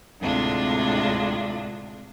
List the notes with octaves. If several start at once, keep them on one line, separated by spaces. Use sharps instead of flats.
D2 A2 C3 G#3 D4 F4